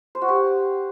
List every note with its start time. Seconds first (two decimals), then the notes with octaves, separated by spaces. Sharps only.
0.15 C5
0.22 F#4
0.28 G4